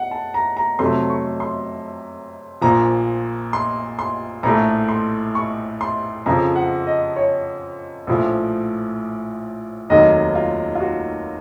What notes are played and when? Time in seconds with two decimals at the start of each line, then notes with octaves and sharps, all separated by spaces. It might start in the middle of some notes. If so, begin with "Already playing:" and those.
Already playing: F#5
0.11 A5
0.34 A#5
0.57 A#5
0.79 F2 C3 F#3 A3 C6
1.10 C#6
1.40 C6
2.61 A#1 A#2 F3 A#5
3.53 C6
3.99 C6
4.43 A#1 A2 A3 A#5
4.89 C6
5.35 C#6
5.81 C6
6.26 F2 C#3 F3 A#5
6.55 F#5
6.87 D#5
7.16 C#5
8.07 A#1 A2 F3
9.90 F1 D#2 D#3 F#3 D#5
10.35 F4
10.75 F4
10.80 F#4